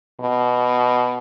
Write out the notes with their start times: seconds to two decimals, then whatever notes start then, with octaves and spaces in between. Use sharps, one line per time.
0.20 B2